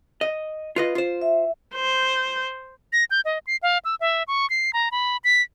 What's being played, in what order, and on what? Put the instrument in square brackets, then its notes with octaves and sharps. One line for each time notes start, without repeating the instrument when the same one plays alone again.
[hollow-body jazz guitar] D#5
F4 B4 D#5
F4 C5
[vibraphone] E5
[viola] C5
[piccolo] A#6
G6
D#5
C7
F5
E6
E5
C#6
C7
A#5
B5
B6